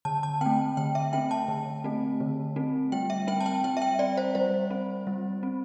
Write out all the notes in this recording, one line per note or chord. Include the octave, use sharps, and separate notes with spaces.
D3 A5
A5
A3 C4 G5
D3 G5
E5
A3 C4 G5
A5
D3
A3 C4
D3
A3 C4
G3 G5
E5
C4 G5
A5
G5
G3 G5
E5
G5
C4 D5
C5
G3 C5
C4
G3
C4